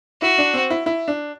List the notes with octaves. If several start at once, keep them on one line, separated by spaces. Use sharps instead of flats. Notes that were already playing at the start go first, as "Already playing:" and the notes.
E4 F#4
D4
C4
E4
E4
D4